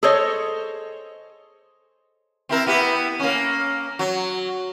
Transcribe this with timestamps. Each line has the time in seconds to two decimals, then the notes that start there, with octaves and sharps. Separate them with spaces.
0.03 G#4 A4 C5 C#5 D#5
2.49 C4 E4 A#4
2.67 B3 E4 G4
3.20 A#3 C#4
3.99 F#3